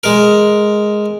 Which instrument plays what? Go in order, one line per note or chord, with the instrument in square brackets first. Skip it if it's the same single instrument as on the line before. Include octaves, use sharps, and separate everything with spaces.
[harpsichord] G#3 A#4